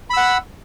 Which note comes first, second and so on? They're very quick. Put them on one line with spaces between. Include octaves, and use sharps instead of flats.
B5 E6 F#5